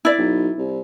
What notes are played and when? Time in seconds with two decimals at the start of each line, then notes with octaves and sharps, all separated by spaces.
0.05 E4 D5
0.18 B1
0.58 C2